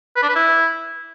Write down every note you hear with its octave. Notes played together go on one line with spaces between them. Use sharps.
B4
D4
B4
E4